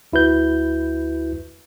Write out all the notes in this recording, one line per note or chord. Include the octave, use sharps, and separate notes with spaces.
D2 E4 F#4 B4 G6